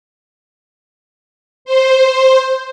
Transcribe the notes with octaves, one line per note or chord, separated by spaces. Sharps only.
C5